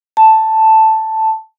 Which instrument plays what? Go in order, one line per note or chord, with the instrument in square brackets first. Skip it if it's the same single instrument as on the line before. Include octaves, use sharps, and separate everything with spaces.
[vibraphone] A5